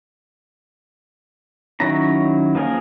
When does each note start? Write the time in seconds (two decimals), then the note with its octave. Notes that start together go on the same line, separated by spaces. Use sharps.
1.80 D#3 F#3 C#4 E4 A#5
2.55 F3 A#3 G#4 A#4